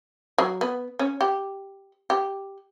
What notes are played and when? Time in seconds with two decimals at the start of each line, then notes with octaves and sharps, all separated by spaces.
0.38 F#3
0.61 B3
0.99 C#4
1.21 G4
2.10 G4